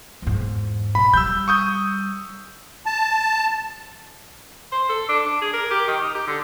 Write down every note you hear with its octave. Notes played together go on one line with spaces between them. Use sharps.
E2 G#2
B2 B5
G3 E6 G6
C#6 D#6 G6
A5
C5
A4
D4
D4
G#4
A#4
G4
D#3
D#4
G4
D3